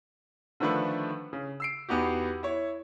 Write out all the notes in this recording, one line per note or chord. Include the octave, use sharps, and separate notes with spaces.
D3 D#3 F3 A3 D4 B4
C#3
E6 C7 D7
E2 B3 D#4 F#4 G4
E4 C#5